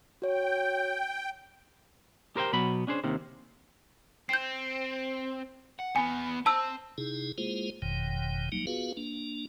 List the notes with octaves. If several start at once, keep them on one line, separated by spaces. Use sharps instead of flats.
F#4 C#5 G5
G4 A#4 C5 E5 G5
B2 F#3 B3 B5
C#4 D4 G#4 C5
D#2 C3 D#3
C4 G6 C7
F#5
E2 B3 G#5
C4 A5 E6
C3 D#4 E4 G#4
G#3 A#3 E4 F4 G#4 C5
F#1 F2 B2 D#3 G5
F#3 G3 A#3 D#4
B3 F4 F#4 G#4 B4 F5
A#3 D4